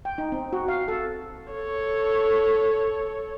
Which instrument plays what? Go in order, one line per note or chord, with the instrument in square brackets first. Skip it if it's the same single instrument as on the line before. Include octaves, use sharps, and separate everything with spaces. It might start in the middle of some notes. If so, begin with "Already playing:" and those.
[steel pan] G5
D#4
C4
F#4
F5
A4
[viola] A4 C#5